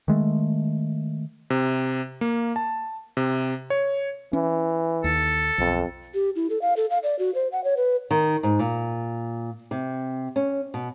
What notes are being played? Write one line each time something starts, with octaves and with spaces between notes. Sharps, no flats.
D#3 G#3 A3
C3
A#3
A5
C3
C#5
E3 C#4
D#2 A4
B1 F2
G4
E4
A4
F5
A4
F5
D5
F#4
C5
F#5
C#5
B4
D#3
G#2
A#2
C3
C#4
B2